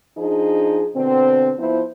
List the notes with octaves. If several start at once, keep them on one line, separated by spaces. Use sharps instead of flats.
F3 D4 D#4 G#4
B2 D3 C4
F3 B3 E4 C5